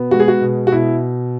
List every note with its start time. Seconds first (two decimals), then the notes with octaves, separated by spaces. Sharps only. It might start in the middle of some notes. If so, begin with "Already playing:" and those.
Already playing: B2 B3
0.11 G#3 F#4
0.20 G#4
0.28 F#4
0.41 B2
0.67 F#4
0.72 B2 E4